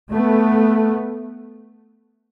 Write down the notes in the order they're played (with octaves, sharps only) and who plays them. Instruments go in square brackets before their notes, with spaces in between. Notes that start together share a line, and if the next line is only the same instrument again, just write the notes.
[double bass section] A3 B3